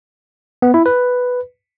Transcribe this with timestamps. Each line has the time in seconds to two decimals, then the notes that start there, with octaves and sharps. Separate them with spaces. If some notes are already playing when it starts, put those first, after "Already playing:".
0.62 B3
0.74 E4
0.86 B4